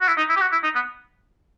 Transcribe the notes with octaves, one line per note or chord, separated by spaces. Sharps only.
F#4
E4
D#4
E4
G4
F#4
E4
D#4
B3